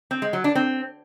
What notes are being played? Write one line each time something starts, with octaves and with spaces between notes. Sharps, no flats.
C4
G#3
F#3
D4
C4